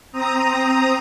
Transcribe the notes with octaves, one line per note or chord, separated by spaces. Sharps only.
C4 A#5 D#6